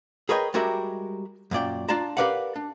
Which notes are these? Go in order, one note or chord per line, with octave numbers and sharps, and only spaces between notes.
G#4 A#4 B4 C#5 D#5 G5
G3 G#3 F#4 G4 A#4 E5
F#2 A#2 D5 G5
D4 F4 D5 A5 A#5
G4 A#4 B4 D5 F5 F#5
D4